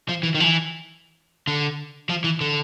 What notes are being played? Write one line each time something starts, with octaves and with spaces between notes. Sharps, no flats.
F3
E3
D#3
F3
E3
D3
F3
E3
D3